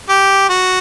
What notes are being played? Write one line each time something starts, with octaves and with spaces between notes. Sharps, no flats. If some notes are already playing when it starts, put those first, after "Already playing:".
G4
F#4